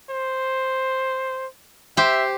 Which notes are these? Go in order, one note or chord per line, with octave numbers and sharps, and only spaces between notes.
C5
G4 C5 E5